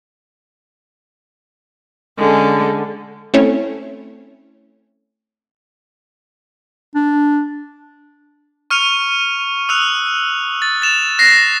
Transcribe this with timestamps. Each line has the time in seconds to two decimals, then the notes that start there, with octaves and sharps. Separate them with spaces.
2.18 D3 G#3 C#4 A4
3.34 A3 C4 C#4 E4 C#5
6.95 D4
8.70 C#6 F6 C#7 D#7 F7
9.69 D#6 E6 F#6 F7
10.62 A6
10.82 A6 E7 F7
11.18 F#6 A#6 C7